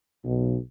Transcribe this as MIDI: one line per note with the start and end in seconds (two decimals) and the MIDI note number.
0.24 0.55 35